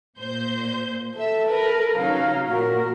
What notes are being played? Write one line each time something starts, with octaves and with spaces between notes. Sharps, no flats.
A#2 C5 G6
A4 E5
A#4 B4
C#3 F#3 D#4 F5 A#5
A#2 F#4 A#4